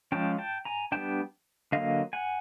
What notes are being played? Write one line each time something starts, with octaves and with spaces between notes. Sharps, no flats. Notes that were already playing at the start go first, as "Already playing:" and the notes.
F3 G#3 C#4 G5 A5
G5 A5
G#5 A#5
G3 B3 D4 G5 A5
D3 F#3 A#3 D#5 F5
F#5 G#5